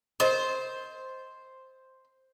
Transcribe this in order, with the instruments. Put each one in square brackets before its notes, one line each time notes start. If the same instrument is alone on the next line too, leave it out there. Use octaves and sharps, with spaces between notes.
[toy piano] A#4 D#5 [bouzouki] C5